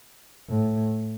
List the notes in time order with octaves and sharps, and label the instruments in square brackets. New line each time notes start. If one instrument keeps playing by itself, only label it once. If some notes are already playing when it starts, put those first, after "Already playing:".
[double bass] A2